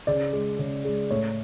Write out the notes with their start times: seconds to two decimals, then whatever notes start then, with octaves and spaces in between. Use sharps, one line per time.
0.07 C#3 D5
0.33 G#3
0.59 C#3
0.85 G#3
1.11 A2 C#5